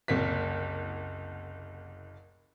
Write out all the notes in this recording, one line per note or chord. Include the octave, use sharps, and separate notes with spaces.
F#1 C2 A#3 B6